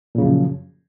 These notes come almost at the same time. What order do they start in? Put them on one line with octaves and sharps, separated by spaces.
A#2 C#3 F#2 F3